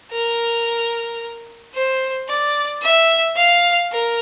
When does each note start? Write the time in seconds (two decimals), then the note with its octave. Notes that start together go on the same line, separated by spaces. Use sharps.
0.11 A#4
1.74 C5
2.28 D5
2.82 E5
3.36 F5
3.91 A#4